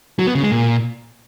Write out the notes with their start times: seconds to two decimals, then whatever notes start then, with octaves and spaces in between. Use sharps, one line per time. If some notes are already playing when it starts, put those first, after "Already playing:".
0.19 F#3
0.27 B3
0.35 C#3
0.43 G#3
0.51 A#2